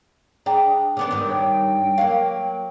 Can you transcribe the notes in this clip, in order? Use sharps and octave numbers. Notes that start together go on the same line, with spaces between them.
D4 G#4 G5 A#5
C#3 B3 D4 D6
G2 D#3
C#5 G5
F#3 A#3 F5